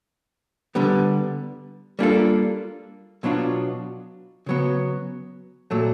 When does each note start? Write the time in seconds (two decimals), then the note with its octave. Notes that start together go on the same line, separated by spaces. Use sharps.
0.75 D3 G3 B3
1.99 G3 A#3 D4 F4 A4
3.23 B2 F#3 B3 D4 F4
4.46 C#3 F#3 B3
5.71 A#2 F#3 A3